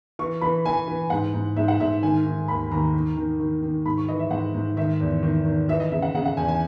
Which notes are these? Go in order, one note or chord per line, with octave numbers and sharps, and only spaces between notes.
E3 C#6
E3 B5
E3 G#5
E3
G#2 F#5
G#2
G#2 E5
F#5
G#2 E5
D#3 G#5
D#3
D#2 B5
D#2 A#5
D#3
D#3
D#3
D#3
G#2 B5
C#6
E3 D#5
E5
G#2 F#5
G#2
D#3 E5
E2
D#3
D#3
E3 E5
D#5
C#3 E5
F#5
C#3 F#5
F#5
E2 G#5
G#5